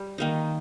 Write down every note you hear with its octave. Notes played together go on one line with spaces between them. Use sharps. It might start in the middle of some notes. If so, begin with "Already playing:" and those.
Already playing: G3
D#3 A#3 D#4